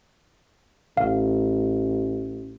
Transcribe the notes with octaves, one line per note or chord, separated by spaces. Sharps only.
A1 F5